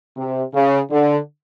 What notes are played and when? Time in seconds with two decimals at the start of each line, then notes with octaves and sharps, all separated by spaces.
0.17 C3
0.53 C#3
0.90 D3